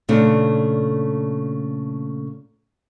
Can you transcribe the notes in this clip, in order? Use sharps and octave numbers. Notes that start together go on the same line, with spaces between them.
A#2 C#3 A3 D4